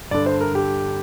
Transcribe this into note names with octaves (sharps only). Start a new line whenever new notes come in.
G2 D3 D5
C5
A#4
G4